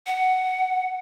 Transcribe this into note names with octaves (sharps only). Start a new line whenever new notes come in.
F#5